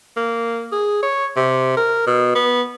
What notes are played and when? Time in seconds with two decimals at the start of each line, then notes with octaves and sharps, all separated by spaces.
0.16 A#3
0.72 G#4
1.03 C#5
1.36 C3
1.77 A#4
2.07 B2
2.35 B3